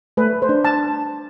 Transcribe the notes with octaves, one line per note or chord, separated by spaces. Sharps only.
A3 B4
C5
D4
A5